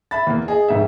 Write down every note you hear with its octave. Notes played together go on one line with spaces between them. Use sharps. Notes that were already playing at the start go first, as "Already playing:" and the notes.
E5 B5 A6
E2 A#3
G#4 D#5
F1 G#2 E5